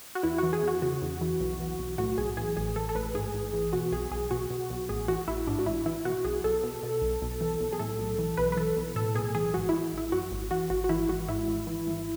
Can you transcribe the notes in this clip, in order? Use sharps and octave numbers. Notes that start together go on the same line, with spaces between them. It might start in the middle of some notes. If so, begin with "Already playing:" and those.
F#4
E2 E4
E3 F#4
G#4
E2 F#4
C#3 F#4
E2
E3
B1
E3
B1
A2 F#4
B1 G#4
E3 G#4
A1 G#4
E3 A4
A4
A1 B4
G#2 G#4
A1
E3
B2 F#4
B1 G#4
B1 G#4
B2 F#4
B2
B1
A1 G#4
E3 F#4
A1 E4
G#2 D4
F#4
A1 E4
E3 E4
B2 F#4
B1 G#4
B1 A4
B2
B2
B1
B1
E3
B1
G#4
A2 A4
B1
E3
B1 B4
B4
E3 A4
B1
A2 A4
B1 G#4
E3 G#4
G#1 F#4
E3 E4
G#1 E4
F#2 F#4
G#1
E3 F#4
G#1 F#4
F#4
E3 E4
G#1 F#4
G#2 E4
G#1
E3
G#1